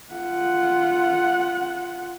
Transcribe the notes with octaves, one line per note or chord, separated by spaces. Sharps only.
F4 F#5